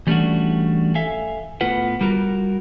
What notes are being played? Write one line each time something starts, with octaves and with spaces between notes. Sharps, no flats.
E3 G3 A3 C#4 D4 F#4
A4 E5 F5 G#5
A2 B3 F4 B4 F#5
G3 F4 F#4 A#4